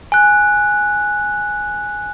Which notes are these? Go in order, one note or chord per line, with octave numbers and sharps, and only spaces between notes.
G#5 F#6